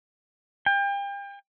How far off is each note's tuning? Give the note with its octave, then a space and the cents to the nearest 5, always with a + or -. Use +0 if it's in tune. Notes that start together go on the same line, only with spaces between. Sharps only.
G5 +35